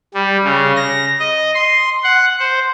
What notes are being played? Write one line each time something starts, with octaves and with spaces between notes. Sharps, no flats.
G3
C#3
A#6
D#5
C6
F#5
C5